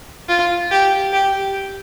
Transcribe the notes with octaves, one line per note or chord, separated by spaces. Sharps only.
F4
G4
G4